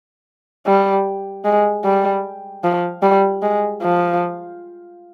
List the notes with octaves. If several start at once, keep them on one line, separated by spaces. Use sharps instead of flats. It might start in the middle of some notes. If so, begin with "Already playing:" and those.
G3
G#3
G3
F3
G3
G#3
F3